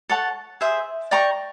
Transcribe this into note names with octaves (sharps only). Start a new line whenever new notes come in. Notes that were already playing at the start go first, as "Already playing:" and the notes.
A4 C#5 F#5 A5
G#4 C5 E5
D5 G5 A#5 C#6